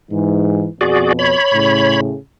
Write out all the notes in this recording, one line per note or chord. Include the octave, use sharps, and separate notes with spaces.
G#2 E3
F2 B2 F#4 G#4 D5
C#5 B5
A2 C#3